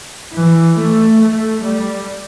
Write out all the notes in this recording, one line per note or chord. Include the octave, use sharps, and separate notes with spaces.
E3
A3
A3
G3